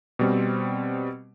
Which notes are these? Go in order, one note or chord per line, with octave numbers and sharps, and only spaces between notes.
B2 G3 C4